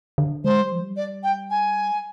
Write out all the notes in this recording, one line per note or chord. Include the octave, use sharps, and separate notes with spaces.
D3
G#3 C5
G3
F3
G3
D5
G5
G#5